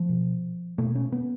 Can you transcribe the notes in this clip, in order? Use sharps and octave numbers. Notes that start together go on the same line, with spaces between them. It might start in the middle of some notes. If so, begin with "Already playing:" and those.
Already playing: F3
B2
B2 A3
C#4
B3